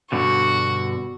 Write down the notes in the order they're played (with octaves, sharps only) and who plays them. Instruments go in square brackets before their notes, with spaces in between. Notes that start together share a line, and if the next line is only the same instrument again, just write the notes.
[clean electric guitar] G2 B2 D3 [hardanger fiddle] F#4